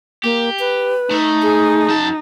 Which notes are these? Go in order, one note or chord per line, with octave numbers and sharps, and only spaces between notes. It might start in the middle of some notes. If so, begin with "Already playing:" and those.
A#3 G4
B4
A3 D#4 E5
G#4
F#2 A5